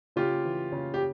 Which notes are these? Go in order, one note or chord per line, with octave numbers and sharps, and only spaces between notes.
C#3 F4 G4
E3
C#3
G4